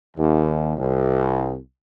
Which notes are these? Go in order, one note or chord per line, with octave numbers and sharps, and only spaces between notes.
D#2
C2